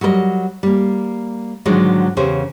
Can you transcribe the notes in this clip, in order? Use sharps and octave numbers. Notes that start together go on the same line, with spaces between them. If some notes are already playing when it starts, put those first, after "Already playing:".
F#3 G3 A#4 B4 D#5
G3 A#3
G#2 D3 D#3 F3 F#3 G#3
E2 C#3 G4 C5 C#5